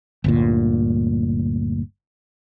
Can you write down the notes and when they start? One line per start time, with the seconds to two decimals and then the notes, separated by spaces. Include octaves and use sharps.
0.24 G1 D2 A#2